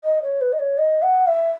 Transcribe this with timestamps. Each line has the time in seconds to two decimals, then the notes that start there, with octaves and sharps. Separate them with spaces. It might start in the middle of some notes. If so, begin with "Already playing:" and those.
0.04 D#5
0.22 C#5
0.41 B4
0.52 D#5
0.58 C#5
0.77 D#5
1.02 F#5
1.27 E5